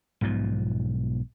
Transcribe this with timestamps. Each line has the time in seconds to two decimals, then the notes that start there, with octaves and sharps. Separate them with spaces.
0.21 B1 G#2 B2 F3